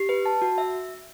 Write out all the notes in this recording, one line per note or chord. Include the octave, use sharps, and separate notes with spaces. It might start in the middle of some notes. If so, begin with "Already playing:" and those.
Already playing: G4
B4
A5
F#4
E5